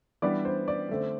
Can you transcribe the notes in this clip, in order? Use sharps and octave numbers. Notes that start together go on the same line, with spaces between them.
E3 G3 B3 D4 D5
C5
D5
D3 A3 C4